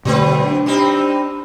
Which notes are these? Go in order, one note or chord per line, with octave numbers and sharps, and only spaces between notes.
B2 D3 F#3 A3 C4 B4
D4
G3 C4 D#4